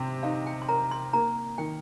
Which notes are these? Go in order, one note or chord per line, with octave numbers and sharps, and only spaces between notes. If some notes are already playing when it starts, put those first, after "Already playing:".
Already playing: C3
D#4 F5
G5
C6
A#4 A#5
C6
A#3 A#5
D#3 G5